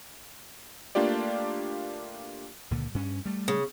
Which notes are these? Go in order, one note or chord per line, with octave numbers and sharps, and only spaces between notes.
A3 A#3 D4 F4 G4 D5
C#2 A#2 D3
G2 C#4
G3 A3
C#3